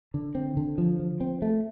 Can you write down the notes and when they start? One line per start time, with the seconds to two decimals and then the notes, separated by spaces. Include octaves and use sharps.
0.14 D3
0.35 C4
0.57 D3
0.78 F3
0.99 F3
1.21 C4
1.42 A3